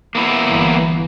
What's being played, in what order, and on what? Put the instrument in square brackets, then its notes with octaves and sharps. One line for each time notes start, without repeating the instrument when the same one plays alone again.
[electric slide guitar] A#3 B3 E4
[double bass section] G1 E3